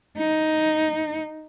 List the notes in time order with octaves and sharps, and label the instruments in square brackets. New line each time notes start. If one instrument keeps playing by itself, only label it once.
[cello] D#4